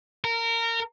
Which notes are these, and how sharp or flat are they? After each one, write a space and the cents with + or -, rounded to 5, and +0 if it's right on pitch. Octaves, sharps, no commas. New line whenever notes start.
A#4 -20